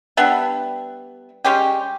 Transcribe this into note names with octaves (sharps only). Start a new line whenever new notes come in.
G3 B3 D4 E5
G3 G#3 C#4 G4